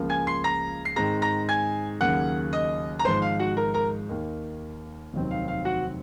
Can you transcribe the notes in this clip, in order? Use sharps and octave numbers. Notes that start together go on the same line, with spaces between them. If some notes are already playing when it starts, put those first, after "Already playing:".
Already playing: C#2 C#3 F3 A#3
G#5 G#6
C6 C7
A#5 A#6
C7
G#2 D#3 G#3 C4 A#5 A#6
A#5 A#6
G#5 G#6
D#2 C#3 F#3 A#3 F#5 F#6
D#5 D#6
A#5
G#1 G#2 F3 C5 C6
F5
F#4 F#5
A#4 A#5
A#4 A#5
D#2 D#3 A#3
F1 D#2 D#3 F#3 C4
F5
F5
F#4 F#5